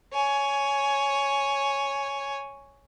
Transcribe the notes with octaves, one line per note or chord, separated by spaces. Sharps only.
C#5 G#5